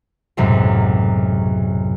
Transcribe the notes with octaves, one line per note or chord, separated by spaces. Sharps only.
B1 F#2 A2 C3 F#3 G#3